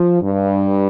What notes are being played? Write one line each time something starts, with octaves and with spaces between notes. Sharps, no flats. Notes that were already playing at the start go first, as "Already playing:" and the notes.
Already playing: F3
G2